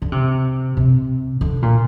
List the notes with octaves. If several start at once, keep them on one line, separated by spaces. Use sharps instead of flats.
D3
C3
C3
D3
A#2